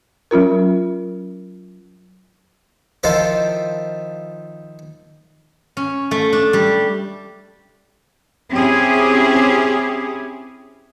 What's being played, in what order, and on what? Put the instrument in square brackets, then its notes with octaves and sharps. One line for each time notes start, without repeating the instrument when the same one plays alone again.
[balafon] F#3 C#4 F4 A#4
[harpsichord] D#3 F3 E4 F4 A4 C5
[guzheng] C#4
A3
D4
G3
[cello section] C4 C#4 E4 G4 G#4